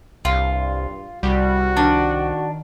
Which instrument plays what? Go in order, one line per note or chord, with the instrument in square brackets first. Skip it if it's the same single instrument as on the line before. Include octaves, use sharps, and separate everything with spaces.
[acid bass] C2 [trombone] G2 [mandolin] F4
[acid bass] C2 [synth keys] G3 [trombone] F#4
[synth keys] D#3 [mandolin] D4